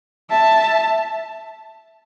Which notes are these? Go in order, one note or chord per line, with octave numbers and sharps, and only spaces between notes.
E5 A5